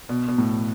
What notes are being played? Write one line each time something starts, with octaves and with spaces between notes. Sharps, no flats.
B2
B2
A2